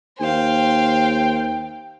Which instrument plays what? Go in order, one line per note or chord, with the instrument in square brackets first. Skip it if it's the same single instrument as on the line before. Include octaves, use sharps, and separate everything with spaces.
[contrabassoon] D#2 [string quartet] C5 F5 [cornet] G5